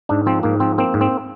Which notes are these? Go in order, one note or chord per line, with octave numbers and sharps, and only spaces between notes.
G#2 D4
F3 C4
G#2 A#3
F3 C4
A#3 C4
G#2
C4